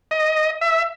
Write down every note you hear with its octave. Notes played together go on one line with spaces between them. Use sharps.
D#5
E5